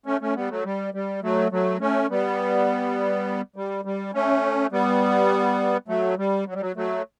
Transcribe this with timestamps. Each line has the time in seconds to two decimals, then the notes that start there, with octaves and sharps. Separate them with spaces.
0.06 A3 C#4
0.21 A3 C#4
0.36 G3 B3
0.50 F#3 A3
0.64 G3
0.94 G3
1.22 F#3 A3
1.52 F#3 A3
1.81 A3 C#4
2.10 G3 B3
3.56 G3
3.85 G3
4.14 A3 C#4
4.72 G3 B3
5.88 F#3 A3
6.18 G3
6.47 F#3
6.54 G3
6.61 F#3
6.76 F#3 A3